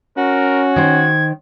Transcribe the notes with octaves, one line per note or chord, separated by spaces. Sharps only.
C#4 F#4 A#4
D#3 C5 G#6